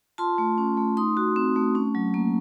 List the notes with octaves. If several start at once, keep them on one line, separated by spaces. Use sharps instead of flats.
F4 A5 C6
A3
C#4
A3
D#4 C6 D#6
F#4
C4
A3
C#4
F#3
A#3